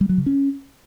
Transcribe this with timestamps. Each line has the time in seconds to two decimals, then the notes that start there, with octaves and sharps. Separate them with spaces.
0.01 G3
0.09 F#3
0.18 C#3
0.26 C#4